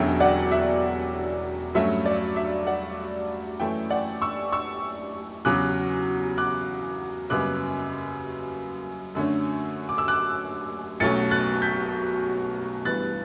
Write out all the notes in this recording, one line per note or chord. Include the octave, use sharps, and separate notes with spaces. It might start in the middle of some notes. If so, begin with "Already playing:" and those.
Already playing: E1 E2 D3 F#3 C#4 E5 G5
D5 F#5
E5
G2 F#3 A3 C#4 E5
D5
E5
D5 F#5
F#2 E3 A3 C#4 E5 G5
D5 F#5
C#6 E6
C#6 E6
E2 C#3 F#3 D6 F#6
D6 F#6
F#1 F#2 C#3 G3 B3 D6 F#6
F#2 D3 A3 C#4
D6
E6
D6 F#6
B1 B2 F#3 A3 C#4 A6 C#7
F#6 A6
G6 B6
G1 G2 E3 B3 F#6 A6